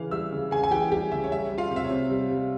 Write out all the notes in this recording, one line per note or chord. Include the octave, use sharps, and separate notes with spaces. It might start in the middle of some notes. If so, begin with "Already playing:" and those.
Already playing: C#3 E3 F5 F6
G3 E5 E6
C#3
C#3 G#4 G#5
G#5
E3 G4 G5
G3 G4 G5
C#3 E5
C#5
G3 E5
G3
F4 F5
C3
E5
C#5
C3
G3
G3